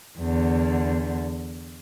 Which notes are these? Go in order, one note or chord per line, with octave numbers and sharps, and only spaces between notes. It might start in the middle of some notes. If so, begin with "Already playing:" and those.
E2 D3